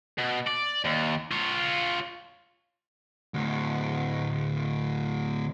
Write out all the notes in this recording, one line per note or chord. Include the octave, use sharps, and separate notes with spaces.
B2
D5
D#2
F4 C#5
D2 A2